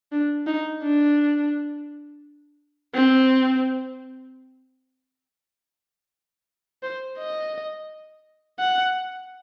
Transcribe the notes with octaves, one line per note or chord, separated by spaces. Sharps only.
D4
D#4
D4
C4
C5
D#5
F#5